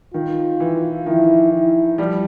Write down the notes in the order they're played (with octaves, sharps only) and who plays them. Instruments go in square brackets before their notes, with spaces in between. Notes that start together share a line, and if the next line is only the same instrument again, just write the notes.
[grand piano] D#3 [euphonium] F4
[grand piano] E3
[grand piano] D#3 F3 [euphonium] E4
[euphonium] E4
[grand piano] F3 G3